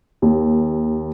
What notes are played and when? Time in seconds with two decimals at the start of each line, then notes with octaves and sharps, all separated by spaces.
0.22 D#2